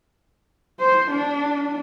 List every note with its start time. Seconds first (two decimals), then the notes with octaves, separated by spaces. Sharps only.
0.79 C5
1.11 D4